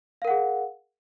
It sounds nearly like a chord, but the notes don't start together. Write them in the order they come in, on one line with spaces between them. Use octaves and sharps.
F5 A#4 F#5 G#4